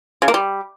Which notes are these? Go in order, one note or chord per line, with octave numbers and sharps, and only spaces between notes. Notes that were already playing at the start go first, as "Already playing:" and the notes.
C#3
A#3
G3